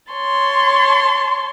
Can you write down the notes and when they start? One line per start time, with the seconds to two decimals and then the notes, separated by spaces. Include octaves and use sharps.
0.12 C#5 A5 C6